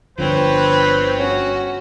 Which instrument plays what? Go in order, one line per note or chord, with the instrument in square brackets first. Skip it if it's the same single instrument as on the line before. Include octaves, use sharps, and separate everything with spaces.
[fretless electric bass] G1 D3 F3 [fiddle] C4 C#5 [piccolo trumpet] B4
[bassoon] C#4 [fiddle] F#4